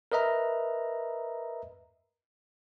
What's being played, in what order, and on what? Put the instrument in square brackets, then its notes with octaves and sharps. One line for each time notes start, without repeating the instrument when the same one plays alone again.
[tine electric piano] A#4 B4 D#5 E5 A#5